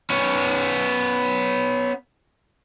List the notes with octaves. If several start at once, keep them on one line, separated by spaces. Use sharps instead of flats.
B3 C#4